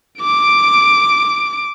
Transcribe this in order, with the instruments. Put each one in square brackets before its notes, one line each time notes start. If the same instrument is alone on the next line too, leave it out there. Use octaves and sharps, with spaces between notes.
[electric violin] D6 D7